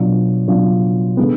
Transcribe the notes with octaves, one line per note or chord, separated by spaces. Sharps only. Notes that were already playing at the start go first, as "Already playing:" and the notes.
Already playing: B2 F#3 D4 F4
B2 F#3 D4 F4
D3 G#3 B3